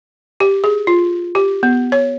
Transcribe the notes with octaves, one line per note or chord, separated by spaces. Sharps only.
G4
G#4
F4
G4
B3
C#5